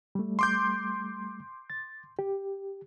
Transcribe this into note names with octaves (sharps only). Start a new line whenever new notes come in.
G3 A3
C6 D6 G6
A6
G4